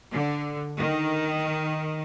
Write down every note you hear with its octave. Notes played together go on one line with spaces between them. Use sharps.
D3
D#3